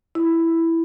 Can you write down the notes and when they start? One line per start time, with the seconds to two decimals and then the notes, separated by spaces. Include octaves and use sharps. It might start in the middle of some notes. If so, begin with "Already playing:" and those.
0.15 E4